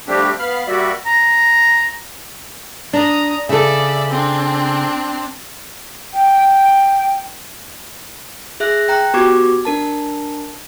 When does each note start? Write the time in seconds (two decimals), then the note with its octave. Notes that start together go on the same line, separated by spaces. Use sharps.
0.08 F3 G3 A3 C4 D4 G4
0.39 B3 F5 B5 F6
0.67 G3 A#3 F#4 D5 E5
1.06 A#5
2.93 D4 A#5 D#6
3.49 C#3 A4 D5 E5
4.10 C4 D4
6.14 G5
8.60 G#4 E5 F#6 A#6
8.88 G5 A#5 F#6
9.14 B3 F#4 G4 C#6 D6 G#6
9.65 D4 A#4 A5